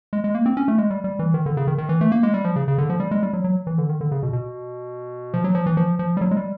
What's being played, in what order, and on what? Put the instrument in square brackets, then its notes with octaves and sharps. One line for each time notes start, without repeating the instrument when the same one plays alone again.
[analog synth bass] G#3
G#3
A#3
C4
C#4
A3
G#3
G3
G3
E3
D#3
D3
C#3
D#3
D#3
E3
A3
A#3
G#3
G3
F3
C#3
C#3
D3
F3
G3
G#3
G3
F#3
F#3
E3
D3
D#3
D3
C#3
B2
B2
F3
F#3
F3
E3
F3
F3
G3
F#3
G#3
G3